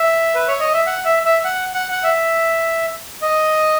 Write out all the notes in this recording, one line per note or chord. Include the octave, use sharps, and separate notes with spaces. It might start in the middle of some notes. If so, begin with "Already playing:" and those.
Already playing: E5
B4
C#5
D#5
E5
F#5
E5
E5
F#5
F#5
F#5
E5
D#5